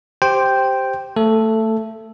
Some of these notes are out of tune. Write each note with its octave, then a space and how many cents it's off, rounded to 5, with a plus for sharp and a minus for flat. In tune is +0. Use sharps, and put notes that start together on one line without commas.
G4 +0 C5 +0 G5 +0
A3 +20 A4 +0